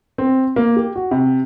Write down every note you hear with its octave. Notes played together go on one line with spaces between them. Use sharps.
C4
A#3
G4
F#4
C3